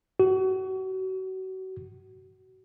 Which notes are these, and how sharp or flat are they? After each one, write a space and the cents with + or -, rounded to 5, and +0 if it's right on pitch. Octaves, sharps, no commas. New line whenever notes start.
F#4 +30